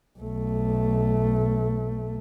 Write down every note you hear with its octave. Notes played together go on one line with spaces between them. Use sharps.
B1 A3